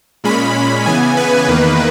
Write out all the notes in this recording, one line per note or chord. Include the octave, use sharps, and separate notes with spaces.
A#2 G#3 C#4 B5
C#3 E3 B3 G#5
B4
E2 D#3 A#3